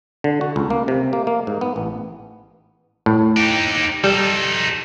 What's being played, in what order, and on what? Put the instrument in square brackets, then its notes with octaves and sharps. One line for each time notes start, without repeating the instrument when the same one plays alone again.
[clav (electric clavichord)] D3
F#4
C#2
A#3
C3
A#3
A#3
G#2
B3
A1
A2
[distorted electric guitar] D#4 G4
[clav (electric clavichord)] G3 [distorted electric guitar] D#4 A4